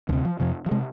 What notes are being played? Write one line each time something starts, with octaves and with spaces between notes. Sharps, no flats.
D2 C3 E3
F3
F2 C3 F3
F3
C3 G#3